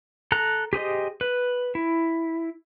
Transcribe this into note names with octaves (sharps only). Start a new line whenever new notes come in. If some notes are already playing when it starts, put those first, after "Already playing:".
A4 A#5 F#6
G4 G#4 C5 D#5
B4
E4